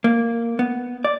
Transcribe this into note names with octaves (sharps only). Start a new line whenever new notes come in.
A#3
B3
D5